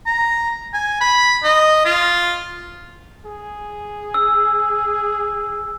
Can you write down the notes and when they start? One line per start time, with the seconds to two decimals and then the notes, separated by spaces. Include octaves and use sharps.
0.06 A#5
0.74 G#5
1.01 B5
1.44 D#5
1.85 F4
3.26 G#4
4.14 E6